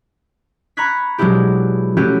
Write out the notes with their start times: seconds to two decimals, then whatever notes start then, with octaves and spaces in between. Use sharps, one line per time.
0.77 A#5 B5 C#6 F#6 G#6 B6
1.18 B2 F#3 G#3 D4 E4 G4
1.97 F#3 A3 C#4 E4 F#4 G4